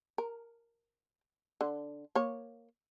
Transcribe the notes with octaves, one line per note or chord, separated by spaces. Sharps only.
A#4
D3
A#3 C#5